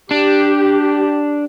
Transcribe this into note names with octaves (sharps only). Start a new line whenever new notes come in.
D4 G4